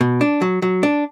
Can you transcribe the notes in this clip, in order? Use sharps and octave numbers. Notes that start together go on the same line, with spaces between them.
B2
D4
F#3
F#3
D4